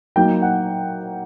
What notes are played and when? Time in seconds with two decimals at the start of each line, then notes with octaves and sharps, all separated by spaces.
0.16 F#3 A#3 D#4 G5
0.42 F#5